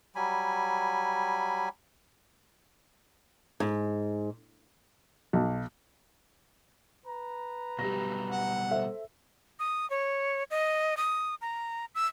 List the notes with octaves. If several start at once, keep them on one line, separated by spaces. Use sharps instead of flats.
F#3 G3 G#5 B5
G#2
B1
B4 A#5
B2 F#3 G3 G4 A#6
F#5
A4 C5 E5
D#6
C#5
D#5
D#6
A#5
E6